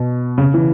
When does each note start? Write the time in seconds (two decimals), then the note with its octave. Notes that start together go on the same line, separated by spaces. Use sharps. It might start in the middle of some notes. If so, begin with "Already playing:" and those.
Already playing: B2
0.38 C#3
0.54 E3